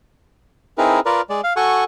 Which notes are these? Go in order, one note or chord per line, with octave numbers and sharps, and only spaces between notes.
C4 D#4 E4 G#4 A#4 B4
F4 A#4 B4 D5
G#3 D5
F5
F#4 A4 F#5 G#5 C#6